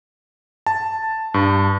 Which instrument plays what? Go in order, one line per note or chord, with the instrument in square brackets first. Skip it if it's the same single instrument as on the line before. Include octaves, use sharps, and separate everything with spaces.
[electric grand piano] A5
G2